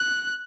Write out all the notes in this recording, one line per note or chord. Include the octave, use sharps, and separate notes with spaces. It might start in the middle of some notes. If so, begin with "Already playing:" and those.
Already playing: F#6